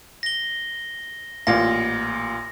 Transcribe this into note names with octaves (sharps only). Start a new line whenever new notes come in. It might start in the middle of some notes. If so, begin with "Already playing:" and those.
A#6 G7
A1 A#2 F5 A#6